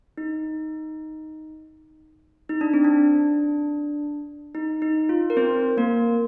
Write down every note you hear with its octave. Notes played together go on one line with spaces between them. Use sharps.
D#4
D#4
D4
C4
D4
D#4
D#4
F4
A#4
C4 C5
A#3 A#4